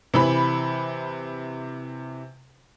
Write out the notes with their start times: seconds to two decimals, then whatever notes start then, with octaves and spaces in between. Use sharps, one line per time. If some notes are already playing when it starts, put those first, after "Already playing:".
0.14 C3 E3 B5